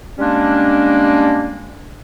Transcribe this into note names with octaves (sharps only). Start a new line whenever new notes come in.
G3 G#3 A#3 C#4 D4